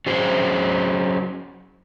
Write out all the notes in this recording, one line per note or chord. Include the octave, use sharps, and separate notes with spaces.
F#3 C#4 G#4 C5